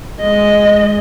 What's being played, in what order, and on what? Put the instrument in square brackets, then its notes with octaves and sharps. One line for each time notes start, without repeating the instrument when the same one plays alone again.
[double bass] G#3 [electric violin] D#5